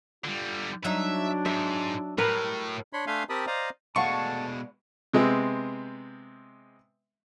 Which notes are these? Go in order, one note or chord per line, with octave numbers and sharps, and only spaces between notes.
D3 G3 F4
F#3 D4 D#4 E5
G#2 E5
A2 G3 A#4 B4
D4 C#5 B5 C6
A3 D4 E5 F5 G#5 C6
C4 G4 A#4 A5 B5 D#6
C5 D5 D#5 F5 A#5
B2 G#3 A3 D5 F5 F#5 A5 C#6
C3 G#3 B3 C4